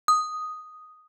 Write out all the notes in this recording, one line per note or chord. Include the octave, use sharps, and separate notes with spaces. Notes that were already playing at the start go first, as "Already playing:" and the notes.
D#6